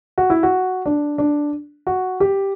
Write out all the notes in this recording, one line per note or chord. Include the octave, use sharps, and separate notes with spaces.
F#4
E4
F#4
D4
D4
F#4
G4